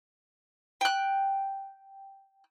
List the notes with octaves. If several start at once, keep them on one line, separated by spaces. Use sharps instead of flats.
G5 F#6